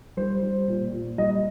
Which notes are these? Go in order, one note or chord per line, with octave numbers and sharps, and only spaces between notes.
G3 C5
G3
A#2
A#2
G3 D#5